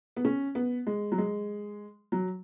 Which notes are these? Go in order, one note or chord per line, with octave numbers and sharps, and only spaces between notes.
B3
C#4
B3
G#3
F#3
G#3
F#3